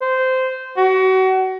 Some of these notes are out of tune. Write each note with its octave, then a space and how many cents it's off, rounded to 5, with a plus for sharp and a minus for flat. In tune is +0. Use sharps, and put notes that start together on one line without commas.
C5 -15
F#4 +30